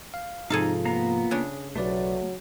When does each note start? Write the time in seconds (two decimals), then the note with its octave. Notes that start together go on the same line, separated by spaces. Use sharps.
0.14 F5
0.50 G#2 C3 F3 D#4 F4 G#4 A4 F5
0.85 A#3 B3 A#5
1.31 C#3 D4 G#4
1.75 B1 F#3 A3 B4 D5